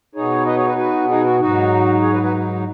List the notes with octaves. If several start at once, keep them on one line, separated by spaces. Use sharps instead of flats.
B2 B3 D#4 G#4 C#5
B4 D#5
G#4 C#5
F#4 B4
F#4 B4
D#4 G#4
F#4
G#2 F#3 D#4 F#4
G#4 C#5
F#4 B4
F#4 B4